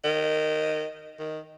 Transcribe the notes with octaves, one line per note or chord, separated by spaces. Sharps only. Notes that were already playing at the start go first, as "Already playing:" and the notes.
D#3
D#3